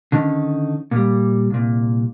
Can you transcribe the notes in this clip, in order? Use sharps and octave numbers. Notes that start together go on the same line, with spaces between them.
D3 D#3 C#4 D#4
A#2 G3
C2 A#2